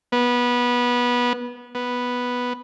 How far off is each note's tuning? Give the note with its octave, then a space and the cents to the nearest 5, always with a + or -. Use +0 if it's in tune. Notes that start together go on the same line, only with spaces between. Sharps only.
B3 -20
B3 -5